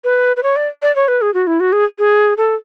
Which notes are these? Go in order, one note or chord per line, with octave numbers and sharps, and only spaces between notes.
B4
B4
C#5
D5
D5
C#5
B4
G#4
F#4
E4
F#4
G#4
G#4
A4